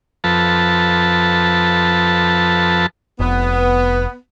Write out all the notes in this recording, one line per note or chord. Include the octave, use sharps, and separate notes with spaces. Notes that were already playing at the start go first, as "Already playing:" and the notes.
F2 F3 A4 B4 A5
F1 B3